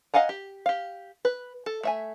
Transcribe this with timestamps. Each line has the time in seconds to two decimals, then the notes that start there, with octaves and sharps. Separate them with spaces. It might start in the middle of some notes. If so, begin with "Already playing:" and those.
0.14 D#5 F5 F#5 G#5 A#5
0.29 G4
0.66 G4 F5
1.25 B4
1.66 A4
1.83 A3 E5 G#5